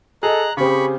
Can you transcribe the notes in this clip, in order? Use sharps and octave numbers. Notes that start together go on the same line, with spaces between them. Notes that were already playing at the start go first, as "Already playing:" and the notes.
G#4 A4 D#5 A#5 F#6
C#3 C4 G4 G#4 B5 C#6